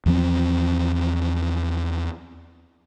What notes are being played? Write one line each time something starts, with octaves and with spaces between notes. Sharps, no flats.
E2 F3 C4